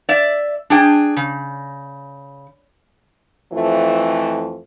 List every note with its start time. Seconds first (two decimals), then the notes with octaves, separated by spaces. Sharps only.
0.09 D5 E5
0.70 D4 G#4 G5
1.17 C#3
3.52 F2 E3 F3 A3